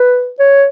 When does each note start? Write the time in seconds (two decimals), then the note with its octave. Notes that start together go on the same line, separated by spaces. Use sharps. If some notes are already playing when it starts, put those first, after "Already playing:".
Already playing: B4
0.40 C#5